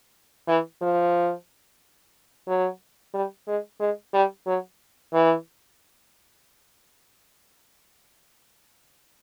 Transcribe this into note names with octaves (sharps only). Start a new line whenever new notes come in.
E3
F3
F#3
G3
G#3
G#3
G3
F#3
E3